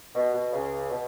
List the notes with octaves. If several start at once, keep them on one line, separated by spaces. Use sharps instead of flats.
B2
B2
C#2 C#3
B2